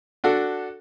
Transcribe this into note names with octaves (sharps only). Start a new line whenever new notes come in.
D4 F#4 A4